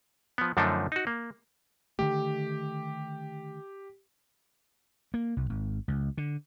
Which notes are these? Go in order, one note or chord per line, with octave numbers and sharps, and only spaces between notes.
F3 B3
F#2 D3 F3 A3 D4 D#4
D#4 F#4
A#3
D3 D#3 A3 G4
A#3
C2
G#1
C#2
D3